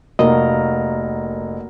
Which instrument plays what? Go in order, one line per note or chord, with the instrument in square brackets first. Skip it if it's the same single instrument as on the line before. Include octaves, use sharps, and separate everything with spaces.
[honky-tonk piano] F1 [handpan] A#3 F#4 A#4 [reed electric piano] D#5